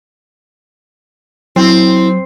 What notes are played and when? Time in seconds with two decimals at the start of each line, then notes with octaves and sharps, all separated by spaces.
1.56 F#3 C4 E4